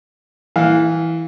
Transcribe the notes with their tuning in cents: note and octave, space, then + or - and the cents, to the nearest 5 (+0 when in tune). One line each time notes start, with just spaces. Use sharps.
E3 -5 F5 +10